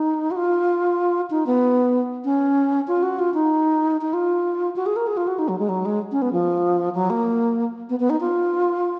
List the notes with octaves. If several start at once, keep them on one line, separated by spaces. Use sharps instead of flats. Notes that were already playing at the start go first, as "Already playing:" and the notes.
Already playing: D#4
F#4
F4
D#4
B3
C#4
F4
F#4
F4
D#4
D#4
F4
F#4
G#4
A#4
G#4
F4
F#4
D#4
F#3
G#3
F#3
G#3
C#4
B3
F3
F#3
A#3
B3
B3
D#4
F4